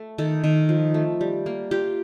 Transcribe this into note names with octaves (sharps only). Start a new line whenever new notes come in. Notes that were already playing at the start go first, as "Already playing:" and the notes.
Already playing: A3
D#3 A4
D#3
F3
A3
G3
A#3
F4 G4